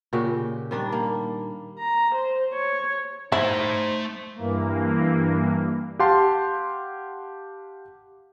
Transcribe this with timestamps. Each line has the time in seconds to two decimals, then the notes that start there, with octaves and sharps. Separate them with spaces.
0.13 A#2 C#3 F#4 G4
0.71 D#3 G3 D4
0.92 A#3
1.79 A#5
2.15 C5
2.53 C#5
3.32 A3 D#4 E4 C5 B5
4.35 G2 E3 A#3
5.99 G4 F5 F#5 A5 C6